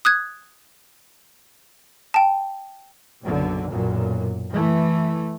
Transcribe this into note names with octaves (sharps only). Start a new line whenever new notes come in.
D#6 F#6 G#6
G5 A5
F#1 B1 D3
B1 F#2 A#2
E3 A3